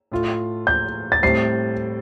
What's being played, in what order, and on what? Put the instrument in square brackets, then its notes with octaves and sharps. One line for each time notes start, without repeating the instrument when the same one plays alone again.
[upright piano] A2 A3 F4
[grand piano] G6
A6
[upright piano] A2 G3 C4 [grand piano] C7